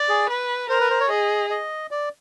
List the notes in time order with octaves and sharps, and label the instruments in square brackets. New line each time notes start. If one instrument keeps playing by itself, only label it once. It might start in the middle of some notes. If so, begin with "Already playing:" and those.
Already playing: [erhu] D5
[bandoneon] G#4
[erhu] B4
[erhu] A#4 [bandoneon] C5
[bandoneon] B4
C5
C#5
[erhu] G#4 [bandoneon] D#5
[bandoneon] D#5
D5